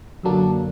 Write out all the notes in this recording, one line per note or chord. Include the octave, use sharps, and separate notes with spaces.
F#2 D3 F#3 A#3 D4